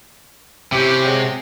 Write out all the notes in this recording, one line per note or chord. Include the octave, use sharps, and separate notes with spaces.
C3 C#4 E4 G4
F#3 G#3